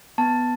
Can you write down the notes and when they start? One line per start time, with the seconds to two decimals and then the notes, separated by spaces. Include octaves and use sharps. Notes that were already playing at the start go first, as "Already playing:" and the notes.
0.18 B3 A5